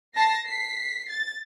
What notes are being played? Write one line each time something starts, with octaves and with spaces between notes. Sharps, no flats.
A5 A#6 C7
B6 C7
A6